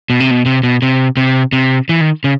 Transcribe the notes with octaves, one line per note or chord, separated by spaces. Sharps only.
B2
C3
B2
C3
B2
C3
C3
C3
E3
D#3
C#3